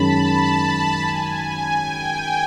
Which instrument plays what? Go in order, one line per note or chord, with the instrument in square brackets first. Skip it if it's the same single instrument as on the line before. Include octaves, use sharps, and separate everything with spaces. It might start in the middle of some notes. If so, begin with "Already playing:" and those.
Already playing: [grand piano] F#2 D#3 G#3 C#4 [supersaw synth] A5 B5
[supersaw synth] G#5
G5